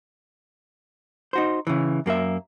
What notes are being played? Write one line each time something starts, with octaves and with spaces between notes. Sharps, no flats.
D#4 F#4 C5
C#3 E3
F#2 A#3 A4 E5